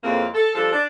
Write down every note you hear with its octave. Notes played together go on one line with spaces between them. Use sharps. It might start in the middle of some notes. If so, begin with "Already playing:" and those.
F2 A2 G#3 A#3 C4
A4
F3 G3 D4 A4
D4